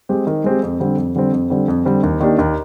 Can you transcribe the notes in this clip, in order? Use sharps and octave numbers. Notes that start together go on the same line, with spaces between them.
G#3 C4 G4
D#3
G#3 C4 G4
F2
D3 G3 C4
F2
D3 G3 C4
F2
D3 G3 C4
F2
D3 G3 C4
D#2
D#3 A#3 D4 G4
D#2